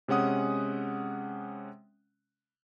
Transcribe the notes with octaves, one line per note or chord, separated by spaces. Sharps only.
C3 G#3 C#4 F#5 D#6